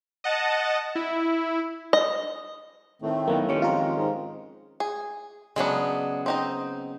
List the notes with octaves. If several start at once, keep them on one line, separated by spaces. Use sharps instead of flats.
D#5 F#5 A5
E4
D#5
A2 D#3 A3 C4
F#2 A#3 B3 D#4
D#3 G#3 C#4 G4 C#5
F2 F4 A#4
G#2
G#4
C#3 F#3 G#3 B3 D4
C4 D#4 D#5